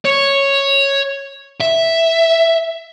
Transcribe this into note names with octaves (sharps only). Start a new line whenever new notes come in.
C#5
E5